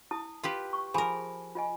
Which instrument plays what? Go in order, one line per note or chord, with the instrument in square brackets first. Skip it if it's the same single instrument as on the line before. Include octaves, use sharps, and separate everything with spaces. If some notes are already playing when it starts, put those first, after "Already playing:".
[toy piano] E4 A5 D#6
[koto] F4 G4 B4
[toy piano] C#6
[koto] F3 A#4 [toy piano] G#4 G#5 B5
[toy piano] F4 D#5 G#5